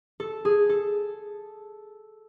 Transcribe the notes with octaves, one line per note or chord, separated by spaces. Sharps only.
A4
G#4
A4